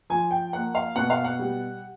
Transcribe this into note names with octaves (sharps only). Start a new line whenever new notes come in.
F3 G#5
G5
A#3 F#5
F5
B2 F#5
F5
F#5
G3